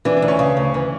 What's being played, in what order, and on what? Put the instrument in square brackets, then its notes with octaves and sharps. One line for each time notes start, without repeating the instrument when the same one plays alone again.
[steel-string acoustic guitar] E3 [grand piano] D4
[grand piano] D4
[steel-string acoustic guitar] D2
[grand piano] C#4
[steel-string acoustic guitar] C#3
D2
E3